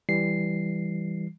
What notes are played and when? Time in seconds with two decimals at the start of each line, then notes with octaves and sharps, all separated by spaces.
0.09 E3 G3 C7